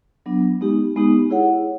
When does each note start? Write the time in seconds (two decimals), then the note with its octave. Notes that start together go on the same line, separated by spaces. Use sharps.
0.26 F#3 B3 D4
0.61 G#3 B3 D#4 G4
0.96 G#3 B3 D#4 G4
1.30 E4 G#4 C#5 F#5